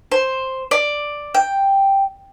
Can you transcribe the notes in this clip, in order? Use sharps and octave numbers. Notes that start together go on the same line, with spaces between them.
C5
D5
G5